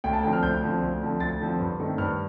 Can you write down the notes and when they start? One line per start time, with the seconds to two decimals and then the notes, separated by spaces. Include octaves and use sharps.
0.04 D2 G5
0.13 A5
0.23 D3 F3 C4 G5
0.33 F6
0.43 D2 G6
0.62 D3 F3 C4
0.82 D2
1.01 D3 F3 C4
1.20 D2 A6
1.40 D3 F3 C4
1.59 G2
1.79 D#3 A3 C4
1.98 G2 F6